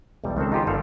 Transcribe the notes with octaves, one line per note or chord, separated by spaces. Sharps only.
B1 E2 G3
C#2 D#3 C4 A4
D#4 F4 G4 G#4 C5
G1 D#3 G3 A4 F5